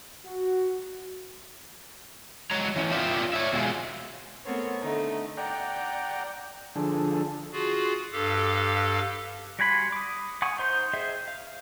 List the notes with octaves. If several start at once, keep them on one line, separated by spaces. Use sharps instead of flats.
F#4
F#3 G#3 C#5 A#5
E3 C#4
B3 F4 G4 D5 E5
C#5 E5
B2 G#3 F4 G#4
A3 B3 C4 A#4 C5 C#5
D3 A3 D#4
D5 F#5 G5 A#5
D3 F3 D4 G#4 A4
F4 F#4 G#4
G2 G4 A4 F5
G3 F#4 G#5 B5 C6
D6 D#6
F#5 G#5 C#6 D#6
D#4 C5 C6 G6
G#4 C5 D#5 E5 G5
F5